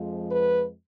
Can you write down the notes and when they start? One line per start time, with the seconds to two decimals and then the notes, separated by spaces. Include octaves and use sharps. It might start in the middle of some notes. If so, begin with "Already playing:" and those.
Already playing: F2 F3 G#3
0.30 B4